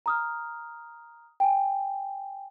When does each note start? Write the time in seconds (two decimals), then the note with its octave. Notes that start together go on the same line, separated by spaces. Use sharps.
0.06 A#5 D#6 F6
1.40 G5 G#5